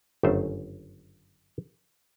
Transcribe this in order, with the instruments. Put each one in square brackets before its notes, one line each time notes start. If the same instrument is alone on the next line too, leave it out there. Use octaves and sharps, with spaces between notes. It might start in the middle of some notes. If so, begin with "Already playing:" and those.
[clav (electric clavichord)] G1 F#2 C#3 A3 C5